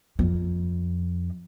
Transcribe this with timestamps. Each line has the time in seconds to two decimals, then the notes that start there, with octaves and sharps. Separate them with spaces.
0.19 F2